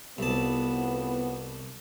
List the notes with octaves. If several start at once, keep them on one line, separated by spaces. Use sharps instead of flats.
C2 F2 A2 B3 A5